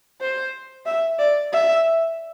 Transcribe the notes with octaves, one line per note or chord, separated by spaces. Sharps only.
C5
E5
D5
E5